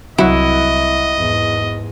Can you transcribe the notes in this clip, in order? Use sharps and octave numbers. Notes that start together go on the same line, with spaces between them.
C2 F#3 E4 D#5 F#5
E2 G#2